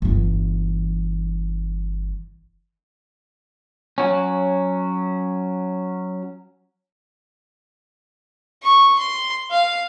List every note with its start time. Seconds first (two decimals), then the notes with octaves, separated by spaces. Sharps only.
0.02 G1 E3
3.98 F#3 C#4
8.63 C#6
8.99 C6
9.51 F5